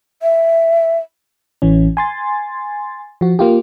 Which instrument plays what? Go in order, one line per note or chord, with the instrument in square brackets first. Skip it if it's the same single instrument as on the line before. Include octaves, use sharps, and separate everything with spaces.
[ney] E5
[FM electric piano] A1 E3 C#4
G#5 C6 A6
F3 F#4
A#3 F4 G4